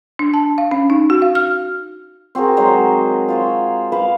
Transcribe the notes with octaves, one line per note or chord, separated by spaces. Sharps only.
D4
A5
F5
C#4
D#4
F#4
F5
F6
C4 F#4 G#4 A#4
D#3 F#3 G#3 C5
F4 C5 C#5
B4 C5 F5 F#5